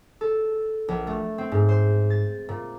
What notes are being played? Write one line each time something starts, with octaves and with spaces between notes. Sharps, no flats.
A4
A#1
A3
C4
G#2
C5
A6
A#2